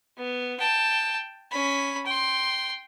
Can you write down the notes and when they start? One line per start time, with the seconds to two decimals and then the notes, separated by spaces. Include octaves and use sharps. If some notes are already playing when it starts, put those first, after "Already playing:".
0.17 B3
0.60 G5 A5
1.52 C#4 B5
2.06 G5 C6